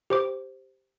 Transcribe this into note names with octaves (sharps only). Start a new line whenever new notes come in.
G4 C5 D6